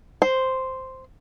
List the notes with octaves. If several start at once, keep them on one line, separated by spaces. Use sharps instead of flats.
C5